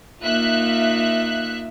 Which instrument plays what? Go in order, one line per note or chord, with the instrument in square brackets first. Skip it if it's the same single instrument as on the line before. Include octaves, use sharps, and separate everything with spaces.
[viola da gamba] A#3 D#4 F4 [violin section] E5 F#6